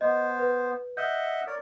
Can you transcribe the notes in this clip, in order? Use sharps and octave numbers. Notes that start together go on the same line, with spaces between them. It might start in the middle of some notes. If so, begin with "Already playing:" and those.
B3 C5 D#5
B4
D#5 E5 F#5 G6
A#4 C#5 D5